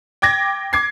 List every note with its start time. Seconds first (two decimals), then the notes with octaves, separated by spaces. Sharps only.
0.22 G5 D6 G#6 A#6
0.73 D6 G#6 C7